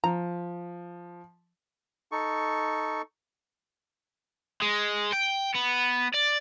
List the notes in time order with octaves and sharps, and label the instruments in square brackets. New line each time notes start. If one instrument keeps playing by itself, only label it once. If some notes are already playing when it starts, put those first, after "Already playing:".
[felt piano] F3 [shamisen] A#5
[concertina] D#4 A4 C#6
[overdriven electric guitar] G#3
G5
B3
D5